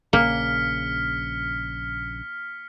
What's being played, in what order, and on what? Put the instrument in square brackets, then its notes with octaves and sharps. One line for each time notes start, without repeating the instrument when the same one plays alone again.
[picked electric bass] A#1 C#3 [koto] A#3 [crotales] F6 B6 C#7